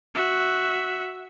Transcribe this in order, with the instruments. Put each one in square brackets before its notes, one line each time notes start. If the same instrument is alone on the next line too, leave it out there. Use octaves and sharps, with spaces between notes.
[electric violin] F#4 E5